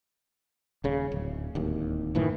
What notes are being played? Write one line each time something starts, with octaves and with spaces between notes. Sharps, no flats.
D#1 C#3
D1
D1 D#2
F#1 A2 D#3 E3